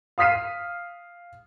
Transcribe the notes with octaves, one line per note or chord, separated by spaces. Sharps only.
F5 D#6 F6 B6 C7 D#7